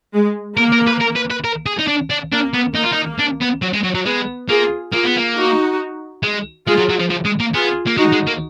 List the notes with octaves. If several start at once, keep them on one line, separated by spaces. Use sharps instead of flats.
G#3
A#3 A#4
A#4
B4
A#4
B4
B4
A#4
G#4
D#4
D4
D4
A#3 D4
B3
A#3 D#4
F4
D#4
D4
B3
F#3
G#3
F#3
F#3
G#3 B3
A#3 F4 G#4
A#3 F4 G#4
B3
A#3
D#4 F#4
G#3
G#3 F4 G#4
F#3
F#3
F3
F3
G#3
A#3
B3 F4 G#4
A#3
G#3 D#4 F#4
G#3
A#3